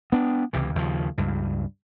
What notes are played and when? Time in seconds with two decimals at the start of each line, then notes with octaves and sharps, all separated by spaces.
0.12 B3 D4
0.53 C#2 C3 E3
0.75 D#2 C#3 F3
1.18 C#2 G2